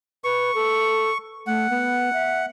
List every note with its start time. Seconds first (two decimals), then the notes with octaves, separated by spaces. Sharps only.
0.24 B4 C#6
0.55 A4
1.47 A3 F#5
1.70 B3
2.13 E5